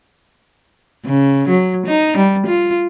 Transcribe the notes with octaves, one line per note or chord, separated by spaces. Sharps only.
C#3
F#3
D#4
G3
F4